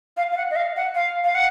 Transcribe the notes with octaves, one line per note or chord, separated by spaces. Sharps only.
F5
F5
F#5
D#5
F5
F#5
F5
F5
F#5